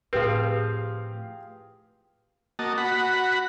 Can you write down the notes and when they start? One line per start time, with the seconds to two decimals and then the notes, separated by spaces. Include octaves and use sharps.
0.13 A2 F3 A3 C4 G4 G#4 B4 F5
2.59 A#3 F#4 D#5 A5
2.78 F#4 F#5 B5